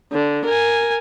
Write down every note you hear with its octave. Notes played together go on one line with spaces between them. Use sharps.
D3
A#4 G#5